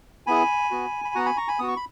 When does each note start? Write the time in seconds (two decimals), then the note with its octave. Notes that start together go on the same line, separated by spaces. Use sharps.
0.27 B3 E4 G#4 G#5 B5
0.71 B3 F#4
1.05 B5
1.15 B3 F#4 F#5 A#5
1.26 G#5 B5
1.37 A#5 C#6
1.48 G#5 B5
1.59 B3 F#4 D#6
1.68 C#6
1.76 B5